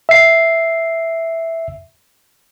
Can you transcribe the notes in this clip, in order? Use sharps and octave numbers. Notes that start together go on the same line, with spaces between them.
E5 C7